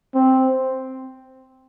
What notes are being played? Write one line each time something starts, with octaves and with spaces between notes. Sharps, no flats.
C4